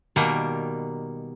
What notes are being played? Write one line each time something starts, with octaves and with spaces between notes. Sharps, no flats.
B2 D#3 G3 A#3